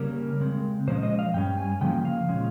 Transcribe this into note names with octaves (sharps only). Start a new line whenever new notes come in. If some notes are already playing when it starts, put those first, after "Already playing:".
Already playing: C#3 G3 A#3 C#4 A#4
C#3 G#3 C4
A#2 F3 G#3 C#4 C5
D#5
F5
G2 G3 C#4 G5
G#5
C#3 F3 A#3 C#4 G5
F5
A#2 F3 G#3 C#4